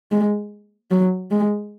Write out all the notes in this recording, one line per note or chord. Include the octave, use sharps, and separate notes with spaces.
G#3
F#3
G#3